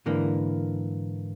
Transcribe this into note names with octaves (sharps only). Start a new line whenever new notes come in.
G#2 D3 E3 A#3